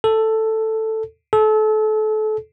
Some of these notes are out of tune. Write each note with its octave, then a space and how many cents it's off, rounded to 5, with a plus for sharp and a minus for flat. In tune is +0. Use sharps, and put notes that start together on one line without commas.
A4 +5
A4 -30